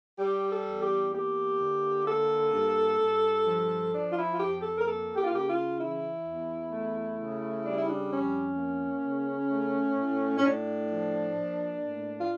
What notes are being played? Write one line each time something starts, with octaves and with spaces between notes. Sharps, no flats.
G3 G4
A4
E2
G4
A#3 G4
D3
A#3 A4
G2
G2
F3
F3 D4
F4
E4
F4
F2 G4
G4
A4
A#4
A#3 A4
G4
F4
C#3 G4
F4
E3 E4
E2
A3
C#3
G3 D4
E4
D4
F2 C#4
A#3
C#3
A3
A2
C#4
A2 D4
F3
A#3
A2
F4